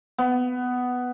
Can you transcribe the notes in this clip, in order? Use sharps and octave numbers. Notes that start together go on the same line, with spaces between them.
B3